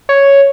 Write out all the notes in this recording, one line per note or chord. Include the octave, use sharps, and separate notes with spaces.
C#5